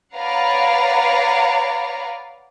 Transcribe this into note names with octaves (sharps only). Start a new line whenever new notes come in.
B4 C#5 D5 F5 F#5 A#5